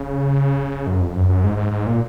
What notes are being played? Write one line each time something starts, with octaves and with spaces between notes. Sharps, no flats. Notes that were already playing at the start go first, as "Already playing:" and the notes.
Already playing: C#3
F#2
F2
F#2
F#2
G#2
G#2
G#2
A#2